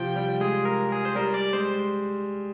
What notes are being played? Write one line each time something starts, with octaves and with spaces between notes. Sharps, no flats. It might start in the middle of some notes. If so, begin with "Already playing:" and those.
Already playing: C3 F3 G5
G3
G#3 G#4
A#4
G#4
C5
G3 A#4
D5
G#3 C5